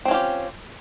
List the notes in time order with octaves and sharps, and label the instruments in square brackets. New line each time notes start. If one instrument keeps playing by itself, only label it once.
[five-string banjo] C4
C#4
F4
G4